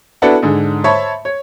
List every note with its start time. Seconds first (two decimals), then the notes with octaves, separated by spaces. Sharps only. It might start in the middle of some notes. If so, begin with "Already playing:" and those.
0.22 B3 D4 E4 F#4 A4 F#5
0.42 G#2 D3 G#4
0.84 C5 C#5 E5 A5 B5 C#6
1.25 C#5